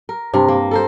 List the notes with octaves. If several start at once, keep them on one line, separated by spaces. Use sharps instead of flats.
A#4
G2 C3 A#4
A#3
A4 A#4 C5